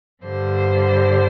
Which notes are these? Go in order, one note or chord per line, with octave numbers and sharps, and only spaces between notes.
G2 D3 G3 C5